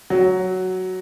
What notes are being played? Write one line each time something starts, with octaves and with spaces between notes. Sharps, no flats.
F#3